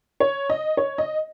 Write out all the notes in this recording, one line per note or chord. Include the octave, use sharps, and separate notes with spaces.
C#5
D#5
C#5
D#5